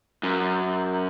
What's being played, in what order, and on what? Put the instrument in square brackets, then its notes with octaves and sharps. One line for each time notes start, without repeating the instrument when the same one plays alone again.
[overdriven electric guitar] F#2